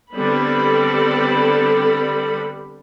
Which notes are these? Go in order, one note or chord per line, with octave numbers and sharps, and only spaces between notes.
D3 G3 B3 C4 A4 B5